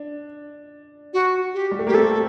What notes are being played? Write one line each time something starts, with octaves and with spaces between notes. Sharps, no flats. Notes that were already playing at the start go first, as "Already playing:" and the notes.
Already playing: D4
F#4
G4
G3
A3
A#3 G4
A3 C4 A4